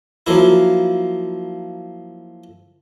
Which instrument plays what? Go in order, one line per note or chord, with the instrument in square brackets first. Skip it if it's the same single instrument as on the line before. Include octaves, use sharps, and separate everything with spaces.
[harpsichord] F3 F#3 A#3 E4